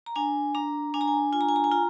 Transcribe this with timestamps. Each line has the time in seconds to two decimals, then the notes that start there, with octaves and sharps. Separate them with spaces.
0.06 A#5
0.16 D4 G#5
0.55 D4 A#5
0.94 D4 G#5
1.01 A#5
1.08 G#5
1.32 F4 G#5
1.41 A#5
1.49 G#5
1.56 A#5
1.64 G#5
1.72 F4 A#5